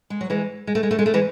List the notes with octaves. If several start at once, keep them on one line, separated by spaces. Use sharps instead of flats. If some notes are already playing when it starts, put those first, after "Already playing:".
G#3
F#3
E3 G#3
G#3
A3
G#3
A3
G#3
A3
E3 G#3